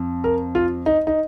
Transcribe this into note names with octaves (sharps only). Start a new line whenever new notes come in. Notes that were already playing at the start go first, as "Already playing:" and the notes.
Already playing: F2
A#4
F4
D#4
D#4